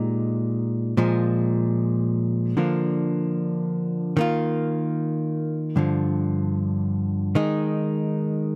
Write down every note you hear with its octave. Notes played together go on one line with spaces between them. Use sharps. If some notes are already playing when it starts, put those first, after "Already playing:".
Already playing: A#2 G#3 D#4 G4
A#2 F3 G#3
D3 F3 A#3 D4
D#3 A#3 F4
G2 D3 F3
D#3 G#3 D#4